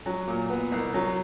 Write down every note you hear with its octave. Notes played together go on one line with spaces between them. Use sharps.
F#3
A#2
B3
C2
F#3